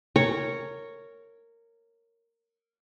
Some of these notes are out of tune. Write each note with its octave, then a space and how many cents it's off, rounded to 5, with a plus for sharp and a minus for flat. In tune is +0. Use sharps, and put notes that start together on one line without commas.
A#4 -15 C#5 +0